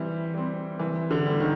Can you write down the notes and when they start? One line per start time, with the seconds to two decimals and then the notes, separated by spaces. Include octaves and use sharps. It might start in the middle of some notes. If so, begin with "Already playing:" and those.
Already playing: E3 G3 C4
0.34 G3 C4
0.80 E3
1.11 D3
1.26 G3 C4
1.40 D#3